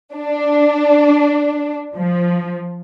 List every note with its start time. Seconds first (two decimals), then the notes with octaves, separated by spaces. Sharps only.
0.14 D4
1.95 F3